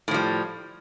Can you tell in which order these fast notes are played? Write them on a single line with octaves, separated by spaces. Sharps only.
A2 F3 G3